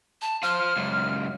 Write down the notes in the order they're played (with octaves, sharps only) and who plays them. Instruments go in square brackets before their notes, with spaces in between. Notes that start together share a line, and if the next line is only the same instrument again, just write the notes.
[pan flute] A5
[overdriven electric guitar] F4 C5 [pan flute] F6
[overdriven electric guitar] C#2 F#2